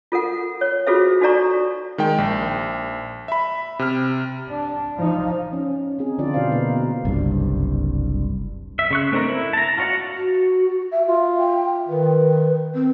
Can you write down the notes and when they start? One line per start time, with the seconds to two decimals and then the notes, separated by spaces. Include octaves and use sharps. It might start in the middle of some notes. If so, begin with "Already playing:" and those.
0.12 F4 A4 A#4 F#5
0.61 C#5
0.87 F4 F#4 G#4 A4 C5 E5
1.21 D#4 F#4 A4 D5 A#5 C#6
1.98 D#3 G#3 G5
2.18 A#1
3.28 E5 B5
3.79 C3 F6
4.49 D4
4.97 F3 D#4
5.53 C#4
5.99 C4 D#4 G#4
6.18 D3 F3 D4 F4 D5
6.34 B2 D3 E4 C5 F5
6.50 B2 A#3 D#4 B4
7.05 F#1 C2 G2
8.79 E5
8.91 C#3 C#6 F#6
9.12 A3 C4 D4 D#4 A#4
9.29 E4
9.53 A5 A#5
9.78 F4 F#4 C#5 D5 F#5
10.16 F#4
10.92 E5
11.07 F4 E5
11.39 G5
11.89 D#3 B4
12.75 C4